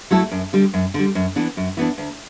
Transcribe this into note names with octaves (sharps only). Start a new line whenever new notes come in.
F#3 A3 E4 A4
F#2
D3 G3
F#2
D3 G3
F#2
E3 B3 D4
F#2
E3 B3 D4
D2